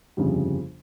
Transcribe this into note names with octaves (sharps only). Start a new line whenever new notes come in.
G1 F2 C#3 G3